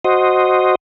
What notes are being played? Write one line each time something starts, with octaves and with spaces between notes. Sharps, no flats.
F#4 C5 D#5